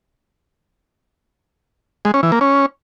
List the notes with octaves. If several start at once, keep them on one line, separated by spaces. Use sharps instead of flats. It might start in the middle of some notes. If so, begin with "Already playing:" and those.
G#3
C#4
E3
A#3
C#4